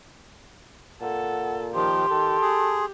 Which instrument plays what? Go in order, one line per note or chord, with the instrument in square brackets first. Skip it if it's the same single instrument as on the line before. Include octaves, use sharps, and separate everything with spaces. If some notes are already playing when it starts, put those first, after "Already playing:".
[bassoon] A#2 [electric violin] A4 [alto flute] F#5
[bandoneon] D#3 F3 [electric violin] G4 [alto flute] C6
[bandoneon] D#3 [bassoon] A4
[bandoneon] G#4